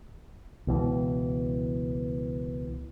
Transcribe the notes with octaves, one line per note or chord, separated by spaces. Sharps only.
C#2 B2 E3